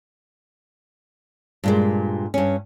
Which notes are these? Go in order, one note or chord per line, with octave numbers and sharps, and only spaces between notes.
G2 A#2 G#3
G2 C#4